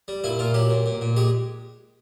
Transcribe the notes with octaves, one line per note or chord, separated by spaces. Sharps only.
G3
A#2 E4
A#2 F4
F#3 G4
A#2
A#2
A#2
G#3 G4